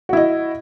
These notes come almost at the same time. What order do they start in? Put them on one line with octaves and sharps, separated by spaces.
F#4 E4 D#5